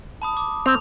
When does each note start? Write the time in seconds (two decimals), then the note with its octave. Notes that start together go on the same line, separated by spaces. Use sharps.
0.22 A5 B5 D#6
0.37 D6
0.66 C4 F7